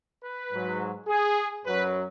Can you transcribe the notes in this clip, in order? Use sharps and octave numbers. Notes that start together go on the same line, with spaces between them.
B4
G#2 F#3
G#4
F#2 F#3 B4